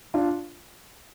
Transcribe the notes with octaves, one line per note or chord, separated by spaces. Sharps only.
D4 F4